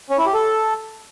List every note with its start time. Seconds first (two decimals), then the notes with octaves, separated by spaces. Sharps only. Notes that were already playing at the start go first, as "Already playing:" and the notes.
0.10 C#4
0.18 E4
0.26 G4
0.34 A4